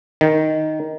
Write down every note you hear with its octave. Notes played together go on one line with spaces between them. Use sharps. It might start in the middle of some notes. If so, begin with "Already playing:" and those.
D#3